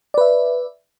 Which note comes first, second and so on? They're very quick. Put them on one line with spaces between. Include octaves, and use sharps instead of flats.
D5 B4 E5